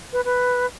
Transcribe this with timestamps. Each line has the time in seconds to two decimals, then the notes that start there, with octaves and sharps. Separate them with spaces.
0.13 B4
0.25 B4